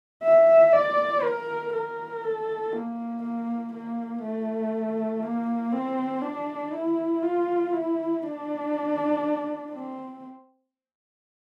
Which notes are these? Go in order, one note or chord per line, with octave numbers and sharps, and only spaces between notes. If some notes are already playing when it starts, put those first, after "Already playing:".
E5
D5
A#4
A#4
A4
A#3
A#3
A#3
A3
A#3
C4
D4
E4
F4
E4
D4
C4